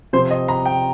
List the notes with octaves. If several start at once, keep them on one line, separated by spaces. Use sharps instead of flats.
C3 F3 C4 C5
D#5
A#5
G5